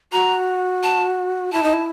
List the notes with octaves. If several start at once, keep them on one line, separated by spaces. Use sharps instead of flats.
F#4 A#5
A5
E4 A5
D#4
E4